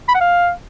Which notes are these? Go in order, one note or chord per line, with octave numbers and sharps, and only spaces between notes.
B5
F#5
F5